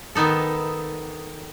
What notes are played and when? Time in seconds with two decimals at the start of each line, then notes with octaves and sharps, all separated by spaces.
0.15 D#3 B3 D#4 A4